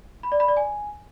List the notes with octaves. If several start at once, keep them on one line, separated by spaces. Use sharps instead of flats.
B5
D5
B5
D5
G#5